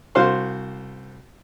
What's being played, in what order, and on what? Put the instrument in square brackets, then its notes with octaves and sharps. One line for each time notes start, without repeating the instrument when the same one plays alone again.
[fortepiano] C2 F#4 C5 F5 C6